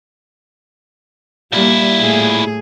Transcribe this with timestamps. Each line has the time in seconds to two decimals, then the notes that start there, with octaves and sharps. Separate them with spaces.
1.52 A#2 G3 A#3 E4
2.01 A2 G#4